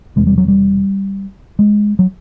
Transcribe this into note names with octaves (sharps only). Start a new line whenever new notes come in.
E1 E2 C3 G#3
G3
F#3
G3
G#3
F#3